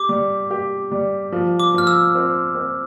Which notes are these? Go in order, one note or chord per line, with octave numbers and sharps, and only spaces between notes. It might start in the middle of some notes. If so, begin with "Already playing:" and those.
Already playing: G4 D6
G3
G4
G3
F3
D6
F3 F6
E6
C4
C4